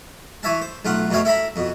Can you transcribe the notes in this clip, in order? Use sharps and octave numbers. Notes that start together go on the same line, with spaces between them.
E3 C#5 E5 A5
C5
B1 A3 F4 F#5
F2 B2 A3 C#5 F5 G5
E4 A4 E5 A#5 B5
F2 B2